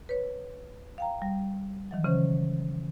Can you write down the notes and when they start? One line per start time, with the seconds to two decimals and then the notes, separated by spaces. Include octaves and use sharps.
0.09 B4 C#5
0.98 F5 G5 A#5
1.22 G3
1.91 D#3 E3 F#3
2.04 C#3 E3 C#4 C5